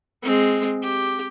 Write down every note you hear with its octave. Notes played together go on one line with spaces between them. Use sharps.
G#3 C4
G4